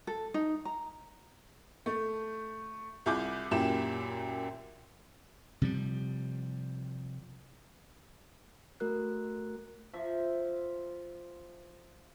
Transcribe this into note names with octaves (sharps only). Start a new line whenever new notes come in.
A4
D#4
A#5
A3
C2 E4 F4 G#4 D6 G6
F#2 A#2 E4 G4 E7
C3 F3 G3
A3 F#4 A#4 F#6
F3 E5